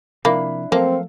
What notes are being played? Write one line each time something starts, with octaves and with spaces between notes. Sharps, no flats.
C3 F3 A#3 C4 D4 E4 B5
F3 F#3 A3 A#3 C4 A4 F5